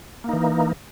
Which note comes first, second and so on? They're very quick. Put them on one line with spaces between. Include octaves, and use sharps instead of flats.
A#3 D#4 E3